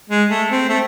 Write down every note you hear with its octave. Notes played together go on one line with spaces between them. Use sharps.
G#3
A3
C4
A3